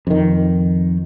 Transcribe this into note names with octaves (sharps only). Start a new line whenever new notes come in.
F2 D#3